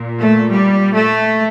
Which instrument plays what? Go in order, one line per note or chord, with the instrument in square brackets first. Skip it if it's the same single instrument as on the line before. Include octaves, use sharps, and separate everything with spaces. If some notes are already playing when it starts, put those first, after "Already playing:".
Already playing: [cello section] A#2
A3
G3
A3